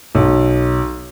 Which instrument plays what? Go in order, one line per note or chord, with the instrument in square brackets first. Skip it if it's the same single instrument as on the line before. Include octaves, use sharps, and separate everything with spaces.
[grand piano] B1